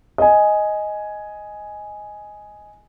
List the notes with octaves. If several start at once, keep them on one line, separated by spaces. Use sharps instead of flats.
D#5 G#5